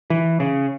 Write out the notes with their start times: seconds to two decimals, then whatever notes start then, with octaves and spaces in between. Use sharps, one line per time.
0.10 E3
0.40 C#3